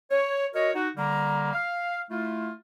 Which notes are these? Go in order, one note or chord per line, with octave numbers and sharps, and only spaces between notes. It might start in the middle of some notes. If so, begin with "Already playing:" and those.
C#5
F#4 A#4 C#5 D#5
D#4 F#4
D3 G3 A#3 A#5
F5
A3 E4 F4